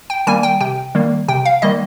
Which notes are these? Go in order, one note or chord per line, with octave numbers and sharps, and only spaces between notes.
G5
D#3 G3 A#3 G#5
G5
C3 G5
D#3 G3 A#3
C3 G5
F5
D#3 G3 A#3 D#5